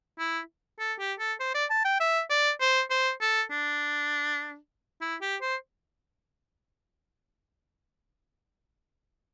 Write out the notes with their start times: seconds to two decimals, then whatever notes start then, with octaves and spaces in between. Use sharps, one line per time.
0.19 E4
0.79 A4
0.99 G4
1.19 A4
1.40 C5
1.55 D5
1.70 A5
1.85 G5
2.00 E5
2.30 D5
2.60 C5
2.90 C5
3.21 A4
3.51 D4
5.01 E4
5.22 G4
5.41 C5